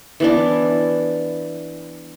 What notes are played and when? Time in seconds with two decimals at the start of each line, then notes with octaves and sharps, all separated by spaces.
0.20 E3 B3 D4